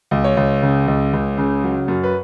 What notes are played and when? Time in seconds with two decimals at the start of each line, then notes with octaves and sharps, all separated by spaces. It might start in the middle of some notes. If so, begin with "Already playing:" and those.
0.11 C#2
0.24 C#5
0.37 C#2
0.62 C#3
0.87 C#2
1.13 C#2
1.38 C#3
1.64 F#3
1.88 F#2
2.03 B4